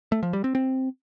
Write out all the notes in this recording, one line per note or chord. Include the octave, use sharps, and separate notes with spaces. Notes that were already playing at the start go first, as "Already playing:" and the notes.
A3
F3
G3
C4
C4